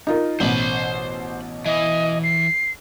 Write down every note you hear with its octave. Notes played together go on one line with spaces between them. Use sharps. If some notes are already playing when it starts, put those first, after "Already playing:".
D#4 F4 A#4
A1 B2 C5 B5
E3 D#5
C7